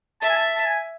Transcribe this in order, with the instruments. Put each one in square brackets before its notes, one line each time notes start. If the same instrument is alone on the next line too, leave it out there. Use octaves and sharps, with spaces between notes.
[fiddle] E5 [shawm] A5
[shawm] G#5
A5
A5
G#5